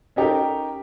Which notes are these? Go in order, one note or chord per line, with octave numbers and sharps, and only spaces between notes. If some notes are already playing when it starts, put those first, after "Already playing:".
C#4 D#4 G4 A4 A#4